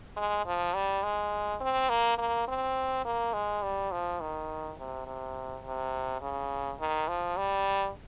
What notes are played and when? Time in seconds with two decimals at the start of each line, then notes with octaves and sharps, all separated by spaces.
0.16 G#3
0.46 F3
0.74 G3
1.03 G#3
1.60 C4
1.89 A#3
2.18 A#3
2.48 C4
3.05 A#3
3.33 G#3
3.62 G3
3.91 F3
4.21 D#3
4.78 C3
5.06 C3
5.64 C3
6.21 C#3
6.79 D#3
7.08 F3
7.37 G3